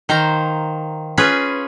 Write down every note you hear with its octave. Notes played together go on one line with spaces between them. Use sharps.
D#3 C5 F5 A#5
C#4 F4 G#4 B4